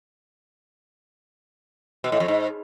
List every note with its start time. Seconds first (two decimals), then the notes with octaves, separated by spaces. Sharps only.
2.04 B2
2.12 A2
2.20 F2
2.28 G#2